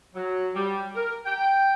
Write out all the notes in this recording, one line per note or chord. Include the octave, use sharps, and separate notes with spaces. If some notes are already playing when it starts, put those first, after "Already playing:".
F#3
G3
A#4
G5